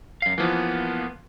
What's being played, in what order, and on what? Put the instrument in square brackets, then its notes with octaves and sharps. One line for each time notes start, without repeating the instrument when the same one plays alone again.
[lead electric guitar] F#2 F5
[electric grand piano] E3 F3 [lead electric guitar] A#3 B3